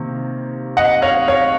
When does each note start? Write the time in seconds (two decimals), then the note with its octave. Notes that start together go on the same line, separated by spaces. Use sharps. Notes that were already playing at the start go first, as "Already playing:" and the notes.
Already playing: C3 D#3 A#3
0.77 D#5 F#5
1.02 C#5 F5
1.28 C#5 F5